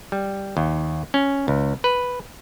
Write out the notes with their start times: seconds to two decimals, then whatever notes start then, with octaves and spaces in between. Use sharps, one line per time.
0.12 G3
0.57 D#2
1.14 C#4
1.48 C#2
1.84 B4